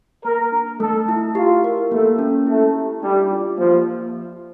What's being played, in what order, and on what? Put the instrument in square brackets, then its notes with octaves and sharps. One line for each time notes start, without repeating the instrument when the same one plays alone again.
[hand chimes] A#3 [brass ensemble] A#4
[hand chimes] D4
[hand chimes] A3 [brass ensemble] A4
[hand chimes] E4
[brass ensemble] F4 [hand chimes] G4
[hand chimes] A#4
[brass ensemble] A3 [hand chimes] A#3
[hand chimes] C#4
[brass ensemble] A3 [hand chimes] E4
[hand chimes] G4
[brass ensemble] G3 [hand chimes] D4
[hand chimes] F4
[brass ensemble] F3 [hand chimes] A#3